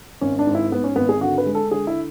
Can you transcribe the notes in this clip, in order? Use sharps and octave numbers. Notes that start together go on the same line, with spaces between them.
G#1 C#4
D4
G#2
E4
G#2 B3
C#4
G#1 B3
G#4
D3 F#4
B4
G#3
A4
D3 G#4
E4